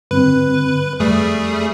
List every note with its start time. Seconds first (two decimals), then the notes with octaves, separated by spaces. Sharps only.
0.11 G2 D3 C4 B4
1.00 F2 G3 A3 G#4